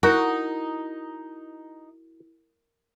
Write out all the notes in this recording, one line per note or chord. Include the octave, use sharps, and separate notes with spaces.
D#4 E4 F#4 A#4